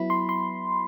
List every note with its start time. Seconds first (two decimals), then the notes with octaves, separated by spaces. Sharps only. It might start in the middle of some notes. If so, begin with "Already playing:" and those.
Already playing: F#3 B3 E4 B5
0.10 C6
0.29 C6